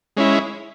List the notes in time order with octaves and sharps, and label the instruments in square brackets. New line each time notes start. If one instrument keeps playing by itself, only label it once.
[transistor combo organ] G#3 C#4 E4